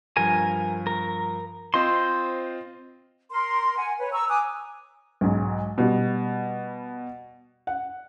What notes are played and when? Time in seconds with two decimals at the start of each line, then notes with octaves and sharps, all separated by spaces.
0.17 G2 F3 A#4 G#5
0.87 A#4
1.74 C4 F4 C5 D#5 C6
3.30 A#4 C6
3.77 F#5 G#5
3.99 B4 C#5
4.12 A#5 C#6 E6
4.29 G#5 D6 D#6 F#6
5.21 B1 G#2
5.78 B2 G3
7.67 F#5